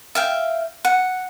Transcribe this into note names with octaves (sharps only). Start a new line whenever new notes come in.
E5 F5 G5
F#5